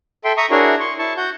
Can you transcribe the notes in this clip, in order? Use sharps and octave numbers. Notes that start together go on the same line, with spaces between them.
A4 E5 G5 C6
E5 A#5 C#6 D#6
D4 E4 F#4 G#4 A#4 C#5
C6 C#6
E4 A5 C#6
F#4 F#5 G6